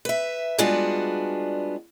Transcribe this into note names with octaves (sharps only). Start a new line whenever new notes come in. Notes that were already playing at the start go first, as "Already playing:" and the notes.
B4 E5
G3 G#3 B3 D4 F4 F#4